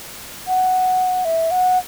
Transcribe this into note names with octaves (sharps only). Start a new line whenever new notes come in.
F#5
E5
F#5